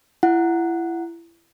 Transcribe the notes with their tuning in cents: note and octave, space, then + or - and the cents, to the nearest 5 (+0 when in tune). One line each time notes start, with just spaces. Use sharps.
E4 +30 F#5 +0